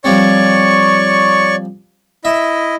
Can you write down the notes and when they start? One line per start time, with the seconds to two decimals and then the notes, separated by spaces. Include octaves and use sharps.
0.04 F3 G3 C4 C#5 D5 C#6
2.25 E4 D#5 E5